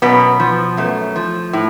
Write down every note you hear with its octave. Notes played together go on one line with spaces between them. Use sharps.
F#2 B2 B3
F3
F#2 A3
F3
A2